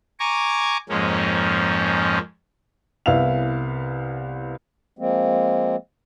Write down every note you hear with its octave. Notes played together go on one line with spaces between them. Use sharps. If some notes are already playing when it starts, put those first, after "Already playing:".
G#5 A#5 C#6 D6
F2 G#2 F3 G#3 A#3 C#4
C2 B3 E4 E5 F5 F7
F3 G#3 A#3 C4